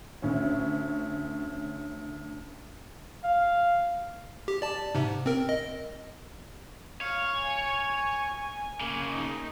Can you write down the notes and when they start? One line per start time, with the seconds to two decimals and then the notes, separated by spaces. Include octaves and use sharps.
0.22 D2 C#4
3.24 F5
4.48 G4
4.62 D5 A5
4.95 G#2 C3
5.26 C4 A#4
5.49 D#5
7.01 C#5 F5
7.36 G#5
8.81 C#3 A#3
9.12 D#4